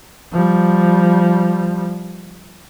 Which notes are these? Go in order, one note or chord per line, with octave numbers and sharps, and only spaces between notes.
F3 G3